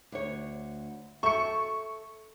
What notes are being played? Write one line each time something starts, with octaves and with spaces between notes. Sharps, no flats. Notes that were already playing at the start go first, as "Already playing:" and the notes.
D2 C#5
A4 E5 C#6 C#7